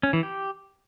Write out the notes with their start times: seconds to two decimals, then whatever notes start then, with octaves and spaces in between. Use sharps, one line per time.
0.03 C#4
0.13 E3
0.23 G4